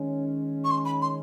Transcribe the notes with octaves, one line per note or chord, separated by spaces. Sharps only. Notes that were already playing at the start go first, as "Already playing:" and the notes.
Already playing: D#3 G#3 C#4
C#6
C6
B5
C6